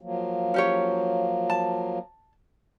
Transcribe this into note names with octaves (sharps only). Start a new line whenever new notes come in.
F3 F#3 A#3
C#4 G4 C#5
A5